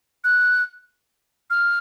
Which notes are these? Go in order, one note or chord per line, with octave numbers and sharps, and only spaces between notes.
F#6
F6